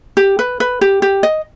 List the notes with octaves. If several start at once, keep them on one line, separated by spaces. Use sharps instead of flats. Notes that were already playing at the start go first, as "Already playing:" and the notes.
G4
B4
B4
G4
G4
D#5